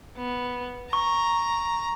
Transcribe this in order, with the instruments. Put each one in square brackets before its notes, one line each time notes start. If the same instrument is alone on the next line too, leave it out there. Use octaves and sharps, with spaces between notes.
[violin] B3
[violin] A#5 [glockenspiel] C#6